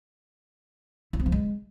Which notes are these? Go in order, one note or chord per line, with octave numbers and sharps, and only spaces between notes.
E4
C4
F3
G#3